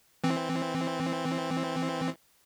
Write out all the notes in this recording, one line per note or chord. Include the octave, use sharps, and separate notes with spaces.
E3 C4